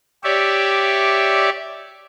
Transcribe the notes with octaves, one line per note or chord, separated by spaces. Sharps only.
G4 C#5 D5 E5